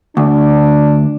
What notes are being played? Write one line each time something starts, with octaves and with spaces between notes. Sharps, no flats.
D2 D4